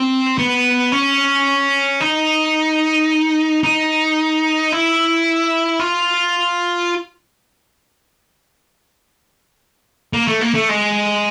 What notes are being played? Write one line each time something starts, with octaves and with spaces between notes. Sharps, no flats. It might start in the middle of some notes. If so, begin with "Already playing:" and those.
Already playing: C4
B3
C#4
D#4
D#4
E4
F4
A#3
A3
A#3
A3
G#3